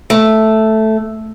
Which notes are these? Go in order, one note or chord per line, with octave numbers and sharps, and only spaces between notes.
A3